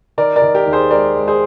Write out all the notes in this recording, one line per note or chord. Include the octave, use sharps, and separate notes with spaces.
D#3 A#4 D5
A#4 D5
D#3
G4 A#4
D#2
G#4 C5
G#3 A#4 D5
G#3
G#4 C5